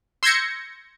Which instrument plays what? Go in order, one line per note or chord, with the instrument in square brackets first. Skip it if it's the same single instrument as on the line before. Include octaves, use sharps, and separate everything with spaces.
[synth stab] C6 E6 G6 G#6 A#6 C#7